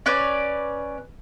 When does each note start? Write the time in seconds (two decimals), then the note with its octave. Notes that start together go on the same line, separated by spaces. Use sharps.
0.06 C#4 B4 D5